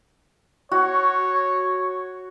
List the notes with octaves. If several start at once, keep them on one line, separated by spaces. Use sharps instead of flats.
F#4 C#5